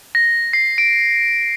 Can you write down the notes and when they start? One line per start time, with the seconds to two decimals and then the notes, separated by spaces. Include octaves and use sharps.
0.15 A#6
0.53 C7
0.78 D7